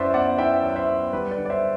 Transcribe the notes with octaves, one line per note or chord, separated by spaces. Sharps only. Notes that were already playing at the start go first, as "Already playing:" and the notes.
Already playing: F#2 E4 B4 C5 D5 E5
B3 D5 F#5
E4 E5 G5
F#3
C5 E5
B3
G3 B4
B4 D5
D3
D5
C5 E5